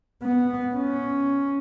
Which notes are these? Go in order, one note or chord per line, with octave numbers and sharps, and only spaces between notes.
B3
C#4